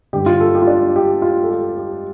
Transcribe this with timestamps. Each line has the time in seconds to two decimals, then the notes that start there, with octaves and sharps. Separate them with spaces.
0.13 G2 D3 G4
0.26 F4
0.40 A4
0.55 G4
0.62 F4
0.67 D4
0.96 G4
1.22 F4
1.44 A4
1.50 G4
1.77 G4